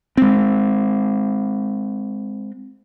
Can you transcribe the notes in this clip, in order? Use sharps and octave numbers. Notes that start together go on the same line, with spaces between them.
G#3 C4